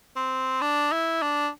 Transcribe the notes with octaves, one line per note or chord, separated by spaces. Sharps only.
C4
D4
E4
D4